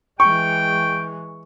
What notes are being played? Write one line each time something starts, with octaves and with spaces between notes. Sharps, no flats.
E3 G#3 G5 C#6